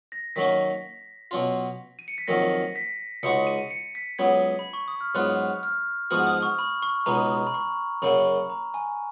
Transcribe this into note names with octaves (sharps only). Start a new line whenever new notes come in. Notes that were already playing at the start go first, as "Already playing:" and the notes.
A#6
D#3 F#3 A#3 C#4 B6
B2 F#3 C#4 F4
D#7
C#7
B6
F2 D#3 F#3 A#3 A#6
B6
C#2 C#3 G#3 D#4 F#4 C#7
D#7
C#7
B6
C#2 C#3 F#3 B3 G#6
B5
C#6
D#6
F6
G#2 F#3 B3 F4 F#6
F6
G#2 F3 B3 F#4 F6
D#6
C#6
B5
C#6
C#2 B2 G#3 B3 D#4 A#5
B5
C#6
F#2 C#3 F#3 A#3 B5
A#5
G#5